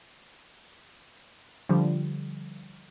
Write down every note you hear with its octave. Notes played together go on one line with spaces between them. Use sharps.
D3 F3 G3